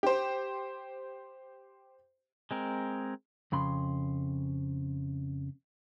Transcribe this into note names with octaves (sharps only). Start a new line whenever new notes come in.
G4 C5
G#3 C4 A#4
F2 C#3 B5 C6